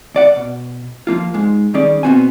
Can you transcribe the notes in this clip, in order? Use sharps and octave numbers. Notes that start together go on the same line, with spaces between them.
D2 D5 F#5
B2
F3 A#3 F4
G#2 G#3
D#3 G3 C#4 G#4 D5
B2 D#3 B3 C4 F#4 G#5